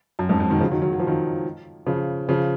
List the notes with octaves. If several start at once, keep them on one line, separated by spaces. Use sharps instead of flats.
F#2
F2 G#2
F2
B2 D#3
C#3 F3
D#3 F#3
D#3 F#3
F#3
F3
D#3 F#3
C#3 F3
C#3 F3